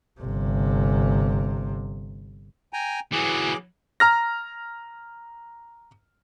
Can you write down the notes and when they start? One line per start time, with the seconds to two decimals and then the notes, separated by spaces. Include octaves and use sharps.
0.20 G1 C3
2.73 G5 G#5 A#5
3.13 E3 F#3 G#4 D6
4.00 A#5 F6 A#6